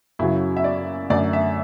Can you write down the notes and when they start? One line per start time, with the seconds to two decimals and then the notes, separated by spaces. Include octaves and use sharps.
0.19 F#2 C#3 F#3 E4
0.57 E5
0.64 D5
1.10 F#2 D3 A3 D5
1.33 E5